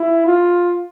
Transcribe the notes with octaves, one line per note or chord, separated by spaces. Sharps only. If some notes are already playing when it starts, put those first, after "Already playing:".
Already playing: E4
F4